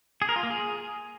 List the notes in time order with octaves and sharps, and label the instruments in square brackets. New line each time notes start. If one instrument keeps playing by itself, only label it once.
[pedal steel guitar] G#4
A#4
F4
A#3
G#4